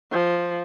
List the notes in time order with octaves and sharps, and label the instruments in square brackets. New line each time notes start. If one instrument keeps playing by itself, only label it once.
[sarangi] F3